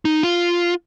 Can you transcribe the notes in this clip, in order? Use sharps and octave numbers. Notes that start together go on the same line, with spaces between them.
D#4
F4